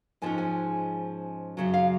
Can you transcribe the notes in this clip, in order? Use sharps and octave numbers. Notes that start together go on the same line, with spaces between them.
G#2 F3 G#3 C#4 G#5
G#5
F#2 C#3 F#3
F5